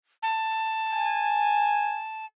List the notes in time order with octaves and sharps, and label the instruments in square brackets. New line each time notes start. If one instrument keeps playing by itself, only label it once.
[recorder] A5
[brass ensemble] G#5